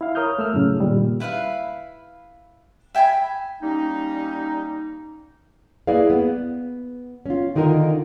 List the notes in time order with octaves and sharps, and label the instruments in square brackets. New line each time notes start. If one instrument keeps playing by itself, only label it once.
[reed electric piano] E4 F5
A#4 C#5 D#6 F6 G6
A3 E6 F6
F#2 A2 C#3
A#2 D#3 G3
[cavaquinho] E4 B4 E5 F5
E5 G5 G#5 B5
[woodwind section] G3 A#3 C#4 D#4
[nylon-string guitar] A#3 E4 G#4 B4 D5 F5
B3
C#4 F4
D3 D#3 D#4 F4 A#4